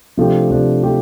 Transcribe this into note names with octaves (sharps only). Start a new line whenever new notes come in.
C3 F3 A3 D4 G4
C3 F3 A3 D4 G4
F3 A3 D4 G4